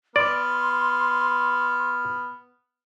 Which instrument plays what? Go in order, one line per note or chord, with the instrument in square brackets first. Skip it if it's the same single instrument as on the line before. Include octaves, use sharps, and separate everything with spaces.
[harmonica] B3 F6 [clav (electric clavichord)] D5 [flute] C6